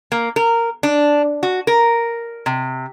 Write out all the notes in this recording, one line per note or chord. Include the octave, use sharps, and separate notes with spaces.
A#3
A#4
D4
F#4
A#4
C3